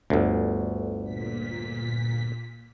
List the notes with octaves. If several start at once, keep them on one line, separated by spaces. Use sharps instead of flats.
G1 D2
A#2 B6